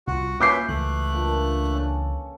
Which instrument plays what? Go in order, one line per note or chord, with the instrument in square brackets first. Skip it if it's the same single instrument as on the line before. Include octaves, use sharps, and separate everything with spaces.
[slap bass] C2 [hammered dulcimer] F4 [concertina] F#4
[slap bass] A#3 [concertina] C#4 B4 E5 [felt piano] D6 G6 C7
[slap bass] C#2 E3 [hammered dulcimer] B2 [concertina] A3 F#6
[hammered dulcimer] A#2 D3 D4
C#4 A4 G#5